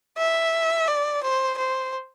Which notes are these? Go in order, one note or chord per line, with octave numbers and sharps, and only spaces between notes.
E5
D5
C5
C5